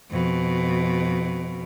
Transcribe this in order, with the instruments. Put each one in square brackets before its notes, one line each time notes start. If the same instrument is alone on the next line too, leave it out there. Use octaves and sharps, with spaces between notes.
[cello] F2 B2